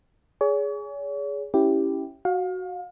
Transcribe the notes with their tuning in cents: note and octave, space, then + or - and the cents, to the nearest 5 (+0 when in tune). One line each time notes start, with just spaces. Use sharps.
G#4 +0 C#5 +40
C#4 +0 E4 +0 G4 +0
F#4 +0 F5 +30